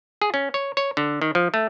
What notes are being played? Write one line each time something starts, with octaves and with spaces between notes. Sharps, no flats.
G#4
C#4
C#5
C#5
D3
D#3
F3
A3